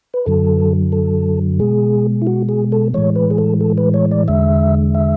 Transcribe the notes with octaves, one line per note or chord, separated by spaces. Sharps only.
B4
F#2 D3 F#3 A4
A4
B2 G#3 G#4
E4
F#4
G#4
A4
A2 E3 G#3 C#5
B4
G#4
A4
A4
B4
C#5
D5
E2 D3 G#3 E5
E5